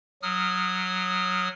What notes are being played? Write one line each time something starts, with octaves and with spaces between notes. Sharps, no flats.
F#3 D#6 F6